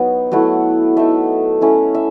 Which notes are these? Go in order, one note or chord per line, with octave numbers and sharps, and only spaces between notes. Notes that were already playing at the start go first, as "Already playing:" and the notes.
Already playing: F#3 B3 D#4
F#3 A3 E4 F#5
A3 D#4 E5
A3 C#4 E4
E5